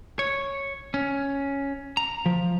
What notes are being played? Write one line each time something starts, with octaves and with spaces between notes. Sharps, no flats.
C#5
C#4
A#5
F3